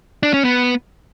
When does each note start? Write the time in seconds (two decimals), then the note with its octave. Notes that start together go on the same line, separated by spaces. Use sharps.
0.23 D4
0.34 C#4
0.44 B3